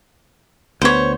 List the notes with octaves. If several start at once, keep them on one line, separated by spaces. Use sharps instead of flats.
D2 B3 C5 C#5